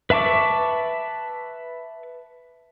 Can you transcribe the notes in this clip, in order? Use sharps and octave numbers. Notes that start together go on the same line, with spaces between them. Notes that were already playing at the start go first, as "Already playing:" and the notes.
B4 E5 A5 C#6 D6